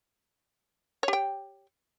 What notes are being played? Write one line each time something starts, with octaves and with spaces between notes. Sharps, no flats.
G4 C#5 G5